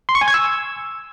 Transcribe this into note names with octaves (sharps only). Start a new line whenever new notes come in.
C6
C#6
G#5
G#6
E6